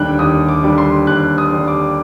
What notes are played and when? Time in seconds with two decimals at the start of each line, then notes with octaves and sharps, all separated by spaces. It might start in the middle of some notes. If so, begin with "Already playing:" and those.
Already playing: D#2 D3 G3 D4 G5 F#6
0.19 D#2 D#6
0.49 D6
0.63 D3 G3 D4
0.78 C6
1.07 D#2 F#6
1.38 D#6
1.52 D3 G3 D4
1.68 D6